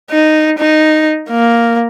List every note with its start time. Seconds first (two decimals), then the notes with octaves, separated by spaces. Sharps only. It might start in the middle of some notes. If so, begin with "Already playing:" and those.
0.11 D#4
0.59 D#4
1.30 A#3